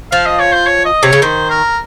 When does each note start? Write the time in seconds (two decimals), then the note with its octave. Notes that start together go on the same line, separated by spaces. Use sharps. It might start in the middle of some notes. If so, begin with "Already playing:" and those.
0.12 F3 F5
0.26 D#5
0.40 C#5
0.53 C5
0.67 C#5
0.86 D#5
1.03 C3 C#5
1.13 C#3
1.22 D#3 C5
1.50 A#4